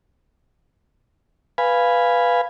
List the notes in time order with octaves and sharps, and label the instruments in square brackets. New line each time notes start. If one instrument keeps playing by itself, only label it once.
[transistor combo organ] B4 F5 G#5 B5